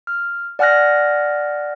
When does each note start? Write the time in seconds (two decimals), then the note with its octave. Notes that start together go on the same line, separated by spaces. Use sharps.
0.07 F6
0.59 D5 F#5 G#5 F6 F#6 A#6